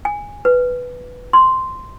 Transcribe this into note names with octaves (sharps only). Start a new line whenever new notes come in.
G#5
B4
C6